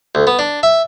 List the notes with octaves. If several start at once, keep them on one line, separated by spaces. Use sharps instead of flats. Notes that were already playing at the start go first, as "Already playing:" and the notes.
D2
B3
D4
E5